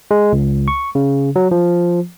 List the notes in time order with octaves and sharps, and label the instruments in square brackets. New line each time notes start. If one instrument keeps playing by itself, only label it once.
[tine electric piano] G#3
C#2
C#6
C#3
F#3
F3